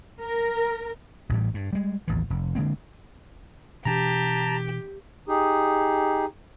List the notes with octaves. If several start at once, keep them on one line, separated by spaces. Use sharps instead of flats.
A#4
A1 A2 E3 G3
G2
G3 G#3
A1 D#2 E3
F1
D3 G#3 A#3 C4
B2 E3 D4 G4 A5 A#5
D#4 G4 G#4